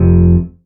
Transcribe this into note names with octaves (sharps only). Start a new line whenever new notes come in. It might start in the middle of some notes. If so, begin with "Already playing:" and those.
Already playing: F1 F2 C3